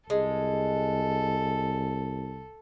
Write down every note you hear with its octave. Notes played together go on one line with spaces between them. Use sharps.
C2 G#3 A4